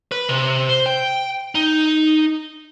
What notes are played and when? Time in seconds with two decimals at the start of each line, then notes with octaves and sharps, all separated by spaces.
0.12 B4
0.29 C3
0.69 C5
0.86 G5
1.55 D#4